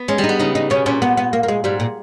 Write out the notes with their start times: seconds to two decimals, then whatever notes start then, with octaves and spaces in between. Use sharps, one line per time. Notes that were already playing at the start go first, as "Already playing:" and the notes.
Already playing: B3
0.08 G#3 C#4
0.18 G3
0.24 D#4
0.29 B3
0.39 C#3 D#4
0.55 D#4
0.70 B2 C#4
0.86 A#2 C#4
1.02 B3
1.17 B3
1.33 A#3
1.43 A#3
1.48 G#3
1.64 G#2 G3
1.80 A#2